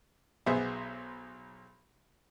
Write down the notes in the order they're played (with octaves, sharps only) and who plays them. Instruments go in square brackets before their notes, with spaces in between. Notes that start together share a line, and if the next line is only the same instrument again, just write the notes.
[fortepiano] B1 B3 G#4 C5 E5